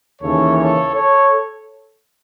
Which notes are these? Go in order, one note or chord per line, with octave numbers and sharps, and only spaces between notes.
D#2 C#3 E3 A4 C#5
A4 C#5
A4 C#5